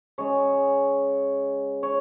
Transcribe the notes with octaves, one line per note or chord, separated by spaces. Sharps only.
C#3 G#3 C#5
C#5